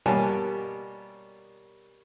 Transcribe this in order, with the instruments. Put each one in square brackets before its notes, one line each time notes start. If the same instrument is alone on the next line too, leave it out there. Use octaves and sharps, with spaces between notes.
[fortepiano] B2 G3 A#3 C#5 G#5 A5